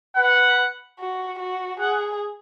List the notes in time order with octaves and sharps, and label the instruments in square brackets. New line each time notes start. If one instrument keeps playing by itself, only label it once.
[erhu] B4 [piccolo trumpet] F#5
[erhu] F#4
F#4
[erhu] G#4 [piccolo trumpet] F#5